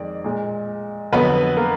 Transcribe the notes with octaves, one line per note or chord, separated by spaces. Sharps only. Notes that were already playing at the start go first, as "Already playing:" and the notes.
Already playing: F2 D#3 G#3 D5
A#2 G#3
F2 D3 F#3 B3 B4
A#3 A#4